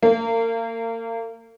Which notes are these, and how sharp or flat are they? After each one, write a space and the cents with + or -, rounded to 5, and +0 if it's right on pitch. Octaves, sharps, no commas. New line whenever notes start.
A#3 -30